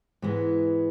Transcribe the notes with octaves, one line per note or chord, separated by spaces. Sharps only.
G#2 E3 G#3 B3